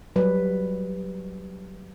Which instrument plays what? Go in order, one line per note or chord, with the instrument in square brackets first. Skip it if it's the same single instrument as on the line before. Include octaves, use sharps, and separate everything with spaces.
[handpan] F#3 G3 B4